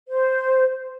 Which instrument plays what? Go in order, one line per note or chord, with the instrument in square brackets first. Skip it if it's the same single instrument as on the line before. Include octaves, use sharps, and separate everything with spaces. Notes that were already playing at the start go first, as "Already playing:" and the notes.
[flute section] C5